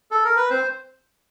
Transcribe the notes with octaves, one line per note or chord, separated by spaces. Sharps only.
A4
A#4
B4
C4 C5